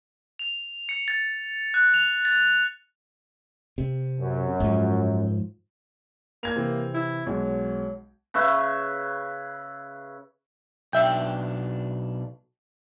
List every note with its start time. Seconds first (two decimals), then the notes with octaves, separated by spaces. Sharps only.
0.39 F7
0.89 C#7
1.08 A6
1.74 F#6
1.94 F7
2.25 A6
3.78 C3
4.20 F#2
4.60 G#2 F3
6.43 A#3 G#6 F7
6.56 C3 E3 C4
6.94 E4
7.26 B1 F#3 G#3
8.34 C#3 B4 E5 C#6
10.93 B1 D4 E5 G5